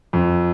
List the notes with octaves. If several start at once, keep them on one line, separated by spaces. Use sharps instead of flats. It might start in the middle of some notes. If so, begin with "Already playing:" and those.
F2